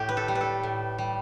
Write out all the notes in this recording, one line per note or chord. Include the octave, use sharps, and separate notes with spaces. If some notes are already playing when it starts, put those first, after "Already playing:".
Already playing: A2 G4
B4
A4
G3
B4
A4
A2
G3